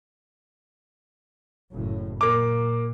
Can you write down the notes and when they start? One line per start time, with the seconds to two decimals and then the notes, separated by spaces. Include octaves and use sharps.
1.73 F#1 A2
2.21 A#2 A#3 D6